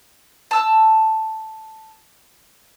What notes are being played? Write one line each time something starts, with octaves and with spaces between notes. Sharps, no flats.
A5 E6